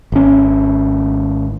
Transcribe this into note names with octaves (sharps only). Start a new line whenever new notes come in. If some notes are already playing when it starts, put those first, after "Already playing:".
G#1 C#4